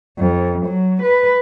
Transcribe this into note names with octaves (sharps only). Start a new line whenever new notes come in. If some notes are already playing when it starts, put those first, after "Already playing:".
F2
F#3
B4